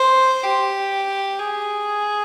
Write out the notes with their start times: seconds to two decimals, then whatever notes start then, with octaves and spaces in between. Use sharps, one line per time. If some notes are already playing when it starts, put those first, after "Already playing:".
Already playing: C5
0.43 G4
1.39 G#4